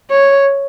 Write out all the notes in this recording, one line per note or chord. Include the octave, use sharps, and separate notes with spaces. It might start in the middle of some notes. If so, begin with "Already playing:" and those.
C#5